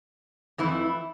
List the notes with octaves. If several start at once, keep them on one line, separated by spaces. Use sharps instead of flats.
F2 E3 A3 E4